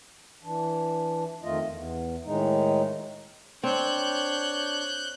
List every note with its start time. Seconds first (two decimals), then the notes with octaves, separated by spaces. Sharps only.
0.43 E3 D4
1.43 F2 D#3 A3 F4 D#5
1.69 E2
2.25 A2 D#3 G#3 D#4
3.64 C4 D4 C#5 F#6 G6